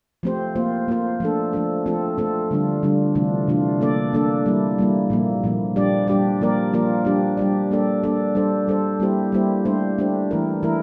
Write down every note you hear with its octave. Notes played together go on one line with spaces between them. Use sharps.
F3 A3 C4 G4 C5
A#3 F4 C5
A#3 F4 C5
F3 A3 D4 A4
F3 A3 D4 A4
F3 A3 C4 F4 A4
F3 A3 C4 F4 A4
D3 G3 D4 F4
D3 G3 D4 F4
C3 E3 A3 D4 F4
C3 E3 A3 D4 F4
A#3 D4 A4 D5
A#3 D4 A4 D5
G3 A#3 E4
G3 A#3 E4
A#2 F3 A#3
A#2 F3 A#3
G3 D4 G4 D5
G3 D4 G4 D5
F3 A#3 F4 A#4 D5
F3 A#3 F4 A#4 D5
G3 D4 G4 D5
G3 D4 G4 D5
A#3 D4 A4 D5
A#3 D4 A4 D5
G3 D4 A4 C5
G3 D4 A4 C5
G3 A#3 E4 G4 C5
G3 A#3 E4 G4 C5
A3 D4 G4 C5
A3 D4 G4 C5
E3 A3 E4 A#4
E3 A3 E4 A#4